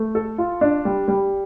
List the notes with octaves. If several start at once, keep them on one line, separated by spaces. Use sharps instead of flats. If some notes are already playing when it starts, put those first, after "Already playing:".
Already playing: A3
A4
F4
D4
G3
G3